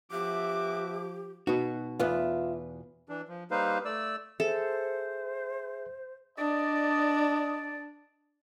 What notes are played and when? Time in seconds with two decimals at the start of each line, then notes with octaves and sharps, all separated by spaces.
0.12 F3 B3 F#4 G4 E5 D6
1.47 B2 D#4 F#4 B4 D#6
1.99 E2 B3 F4 E5
3.09 E3 D4
3.28 F3
3.51 G3 A#3 D#4 B4 C5 F5
3.85 A3 D5 E6
4.40 G#4 A4 C5 E5
6.38 D4 D5 D#5